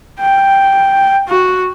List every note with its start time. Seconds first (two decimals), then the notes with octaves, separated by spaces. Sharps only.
0.20 G5
1.28 F#4